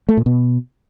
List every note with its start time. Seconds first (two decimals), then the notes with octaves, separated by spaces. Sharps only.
0.09 A3
0.17 A#2
0.26 B2